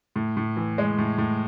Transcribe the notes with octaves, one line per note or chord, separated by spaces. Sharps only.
A2
A2
E3
G#3
A2
A2